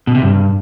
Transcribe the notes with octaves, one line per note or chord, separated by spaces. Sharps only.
B2
C3
G2